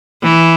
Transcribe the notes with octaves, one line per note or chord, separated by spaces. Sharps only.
E3